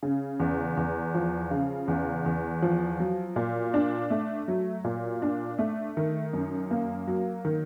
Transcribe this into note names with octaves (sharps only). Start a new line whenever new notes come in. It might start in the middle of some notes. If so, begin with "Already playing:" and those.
C#3
E2
E2
F3
C#3
E2
E2
F3
F#3
A#2
D4
A3
F#3
A#2
D4
A3
D#3
F#2
A#3
F#3
D#3